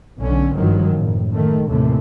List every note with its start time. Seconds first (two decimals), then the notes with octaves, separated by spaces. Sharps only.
0.21 B1 D3 C#4
0.57 G#1 G2 D#3 F3 F#3
0.92 F#1 A2
1.34 D#3 A3
1.69 D#2 A2 C3 E3 A3